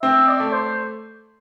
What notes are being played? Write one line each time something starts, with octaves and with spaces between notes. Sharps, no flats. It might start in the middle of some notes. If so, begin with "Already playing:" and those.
C4 E5
D5
A3
C5